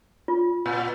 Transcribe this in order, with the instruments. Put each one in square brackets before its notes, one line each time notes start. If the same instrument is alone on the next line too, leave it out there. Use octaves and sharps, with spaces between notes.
[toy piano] F4
[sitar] A#2